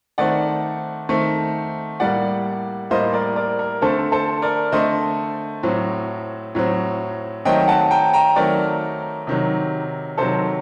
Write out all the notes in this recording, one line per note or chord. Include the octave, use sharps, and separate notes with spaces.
D#3 A3 C4 D5 F#5
D#3 A3 C4
A2 G3 A#3 D5 F#5
A2 G3 A#3 C5 D#5
A#4 D5
A#4 D5
A#4
D3 A3 C4 A4 C5
A4 C5
A#4 D5
D3 A3 C4 C5 D#5
A2 F#3 C4
A2 F#3 C4
D#3 F#3 A3 C4 D#5 G5
F#5 A5
G5 A#5
G5 A#5
D#3 F#3 A3 C4 A#4 D5
C3 D#3 F#3
C3 D#3 F#3 A4 C5